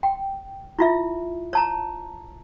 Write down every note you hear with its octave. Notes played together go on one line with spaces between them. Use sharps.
G5
E4 F4 E5
C#5 A5 A#5